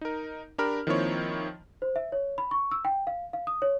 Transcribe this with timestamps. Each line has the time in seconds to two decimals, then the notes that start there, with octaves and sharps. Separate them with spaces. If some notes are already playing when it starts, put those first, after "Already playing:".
0.01 D#4 A#4
0.58 D4 G4 A#4 B5 F6
0.87 D#3 F3 A#3 C4 E4 C#5
1.82 C5
1.96 E5
2.12 C#5
2.38 B5
2.51 C#6
2.71 E6
2.85 G5
3.07 F5
3.33 F5
3.47 D#6
3.62 C#5